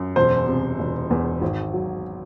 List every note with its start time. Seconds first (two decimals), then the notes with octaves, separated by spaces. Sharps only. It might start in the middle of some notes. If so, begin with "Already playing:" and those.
Already playing: F#2
0.16 E1 C5
0.48 C3
0.79 E1
1.10 E2
1.42 G#1
1.73 F#3